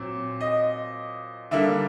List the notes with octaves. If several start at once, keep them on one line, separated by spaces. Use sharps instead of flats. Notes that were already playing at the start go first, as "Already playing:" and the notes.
Already playing: A#2 F#3 C4
D#5
D3 G3 A#3 D4 E5